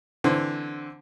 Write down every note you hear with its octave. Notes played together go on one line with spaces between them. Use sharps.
D3 E3 C4